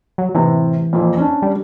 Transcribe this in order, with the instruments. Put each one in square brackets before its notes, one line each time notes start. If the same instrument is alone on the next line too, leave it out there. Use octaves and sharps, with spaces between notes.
[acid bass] F#3
[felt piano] A2 C3 [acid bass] E3
[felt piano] F2 A#2 F3
C#4 D4
[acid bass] G3